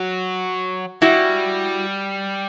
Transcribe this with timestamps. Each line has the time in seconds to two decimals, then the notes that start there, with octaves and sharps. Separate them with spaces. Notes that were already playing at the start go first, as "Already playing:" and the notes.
Already playing: F#3 F#4
1.02 G3 E4 F#4